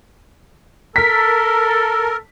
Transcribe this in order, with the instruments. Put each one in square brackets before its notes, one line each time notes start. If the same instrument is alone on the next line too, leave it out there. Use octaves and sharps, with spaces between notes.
[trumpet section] A4 [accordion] A#4 [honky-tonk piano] B6